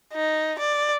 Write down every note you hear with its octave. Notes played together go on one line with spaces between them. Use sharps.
D#4
D5